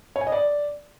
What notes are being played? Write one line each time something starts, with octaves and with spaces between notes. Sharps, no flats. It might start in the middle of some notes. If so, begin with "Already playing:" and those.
C#5
G#5
D#5
D5